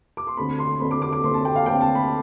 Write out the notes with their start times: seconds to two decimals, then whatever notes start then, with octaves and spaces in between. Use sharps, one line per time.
0.17 D6
0.27 C6
0.37 D2 D3 A3 C4 B5
0.59 C6
0.80 D2 D3 A3 C4 B5
0.91 D6
1.02 D6
1.13 D6
1.24 D2 D3 A3 C4 C6
1.34 A5
1.45 G5
1.56 F5
1.66 D2 D3 A3 C4 G5
1.81 A5
1.95 B5